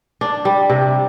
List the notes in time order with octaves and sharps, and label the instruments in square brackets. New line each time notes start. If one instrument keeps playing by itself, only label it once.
[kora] D4
G3
C3